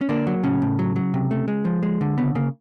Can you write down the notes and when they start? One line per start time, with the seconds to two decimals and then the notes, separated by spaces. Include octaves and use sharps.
0.01 C#4
0.09 D3 A#3 D4
0.27 F#3
0.43 A2 C#3 C#4
0.62 A2
0.79 F#3
0.96 F#3
1.14 C3
1.31 A3
1.48 G#3
1.65 F3
1.83 G#3
2.01 D3
2.18 C#3 B3
2.35 C#3 A#3